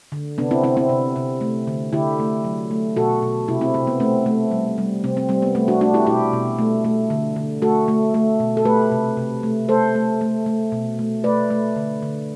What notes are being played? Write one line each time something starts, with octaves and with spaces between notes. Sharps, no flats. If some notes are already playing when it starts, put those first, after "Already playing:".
D3
C3 B3 D4
C4 E4
C3 C4 E4
C4 E4
C3
C3
A3
D3
D3 E4 G4
A3
F#3
A3
B2 F#4 A4
B2
C3 E4 G4
C4 E4
C3 C4
B3
A3 C4
A3
G3
G3
C3 C4
C4
G3 C4
B3
A3 C4
D4 F#4
A3 D4 F#4
E4 G4
B2 E4 G4
B2
A3
A3
D3
D3
A3 F#4 A4
A3
A3
B2
A4
A3 G4 B4
C3
C3
A3
A3 A4 C5
A3
A3
A3
B2
A3
A3 B4 D5
A3
D3
D3